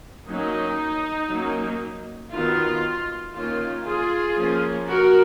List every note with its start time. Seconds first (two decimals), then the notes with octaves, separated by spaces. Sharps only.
0.28 F#3 A#3 C#4 D#4
1.30 F#3 A#3 C#4
2.32 D#3 F#3 B3 F4
3.34 D#3 A#3 C#4 F4
3.85 F4 G#4
4.36 F3 A#3 C#4
4.87 F#4 A#4